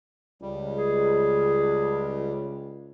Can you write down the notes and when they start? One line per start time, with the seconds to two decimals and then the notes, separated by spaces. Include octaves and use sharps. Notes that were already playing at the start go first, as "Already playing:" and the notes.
0.42 C#2 G3
0.76 G#4